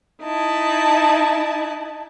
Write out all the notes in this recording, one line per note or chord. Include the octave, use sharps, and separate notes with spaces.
D#4 E4 A5